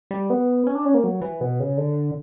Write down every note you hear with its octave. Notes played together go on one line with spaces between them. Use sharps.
G3
B3
C#4
D4
C#4
A#3
F#3
E3
B2
C#3
D3